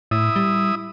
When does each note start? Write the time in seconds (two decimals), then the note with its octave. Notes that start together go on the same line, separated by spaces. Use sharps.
0.11 A2 E4 D#6
0.36 G3